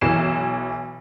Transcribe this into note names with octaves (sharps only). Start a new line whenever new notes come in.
B1 E3 C7 E7